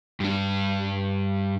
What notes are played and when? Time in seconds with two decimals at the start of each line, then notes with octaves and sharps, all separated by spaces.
0.20 G2 D4